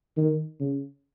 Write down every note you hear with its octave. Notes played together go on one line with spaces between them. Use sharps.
D#3
C#3